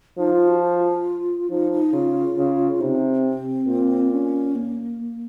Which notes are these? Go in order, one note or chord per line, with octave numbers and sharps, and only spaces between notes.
F3 D#4
F4
F#4
F4
F3 D#4
D#4
C#3 F4
C#3
C3 D#4
C4
A#2
C#4
A#3